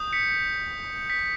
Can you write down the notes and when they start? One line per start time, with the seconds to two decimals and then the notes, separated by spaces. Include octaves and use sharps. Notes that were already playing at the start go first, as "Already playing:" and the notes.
Already playing: D#6 G6
0.13 B6 C#7
1.10 B6